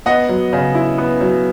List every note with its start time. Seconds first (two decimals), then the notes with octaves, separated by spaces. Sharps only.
0.06 B3 D#5 F#5
0.29 F#3
0.53 C#3
0.75 E4
0.98 B3
1.21 F#3